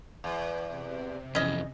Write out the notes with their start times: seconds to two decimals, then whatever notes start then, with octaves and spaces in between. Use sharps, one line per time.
0.24 E2
0.69 C3
1.35 F2 E3 C#4 D#5